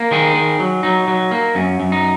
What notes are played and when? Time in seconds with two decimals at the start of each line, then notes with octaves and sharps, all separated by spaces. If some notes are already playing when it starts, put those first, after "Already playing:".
Already playing: A#3
0.11 D#3 D#4 G#4
0.35 D#3
0.59 F#3
0.83 F#3 D#4
1.08 F#3
1.31 A#3
1.55 F#2 C#4
1.80 F#2
1.92 D#4